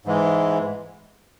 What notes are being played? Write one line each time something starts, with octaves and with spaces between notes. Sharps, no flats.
G#2 E3 G#3